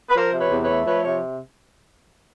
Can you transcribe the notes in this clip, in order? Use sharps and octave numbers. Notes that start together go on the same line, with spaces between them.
B4
F3 A#4 C5
C3
B4 C#5
E2
B4 C#5
A3
F3 B4 C#5
C3 C#5